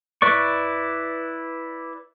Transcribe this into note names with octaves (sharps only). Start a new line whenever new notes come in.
E4 B4 D5 C#6